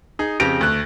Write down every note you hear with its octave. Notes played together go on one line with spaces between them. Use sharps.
D#4 G#4
F2 C#3 G4 A#6 D7 F7
D2 F#6